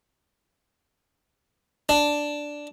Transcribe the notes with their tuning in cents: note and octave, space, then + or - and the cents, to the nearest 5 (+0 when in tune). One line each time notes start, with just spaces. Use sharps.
D4 +0